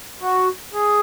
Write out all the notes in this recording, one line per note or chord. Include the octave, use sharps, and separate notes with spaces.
F#4
G#4